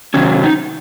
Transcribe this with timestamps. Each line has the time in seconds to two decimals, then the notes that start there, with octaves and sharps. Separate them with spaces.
0.14 C3 D#3 F#3 C#4
0.44 D#4